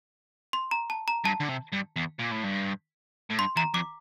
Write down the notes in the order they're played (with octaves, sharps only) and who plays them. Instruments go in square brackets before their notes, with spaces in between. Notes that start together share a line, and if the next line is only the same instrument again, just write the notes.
[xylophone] C6
A#5
A5
A#5
[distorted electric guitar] G2 [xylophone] A5
[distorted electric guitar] D3
C3
G2
E2
A#2
A2
G2
A2
[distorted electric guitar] G2 [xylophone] C6
[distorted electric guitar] E2 [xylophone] A#5
[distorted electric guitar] F2 [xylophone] D6